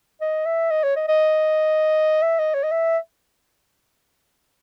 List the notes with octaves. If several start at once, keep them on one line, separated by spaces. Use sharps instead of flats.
D#5
E5
D#5
C#5
D#5
D#5
E5
D#5
C#5
D#5
E5